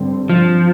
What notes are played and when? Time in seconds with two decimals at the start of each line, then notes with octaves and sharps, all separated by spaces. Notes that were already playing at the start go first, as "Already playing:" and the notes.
Already playing: G2 D3 G3 C4
0.29 F3